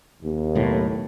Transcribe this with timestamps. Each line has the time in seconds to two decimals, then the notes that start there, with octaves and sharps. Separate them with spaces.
0.22 D#2
0.55 B1 A2